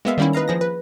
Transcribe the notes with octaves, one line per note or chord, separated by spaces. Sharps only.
G#3 A#3 B3 E5 F5
D#3 G3 A#3 C#4 E4
B4 D#5 F5 A#5
F3 G#4 A#6
B4